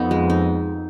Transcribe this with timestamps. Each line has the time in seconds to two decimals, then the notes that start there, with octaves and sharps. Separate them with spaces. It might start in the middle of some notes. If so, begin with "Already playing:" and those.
Already playing: F2 B3 D#4
0.11 G#3
0.30 D#4